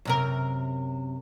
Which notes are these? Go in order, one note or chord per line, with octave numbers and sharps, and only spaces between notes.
F#2 C3 A#4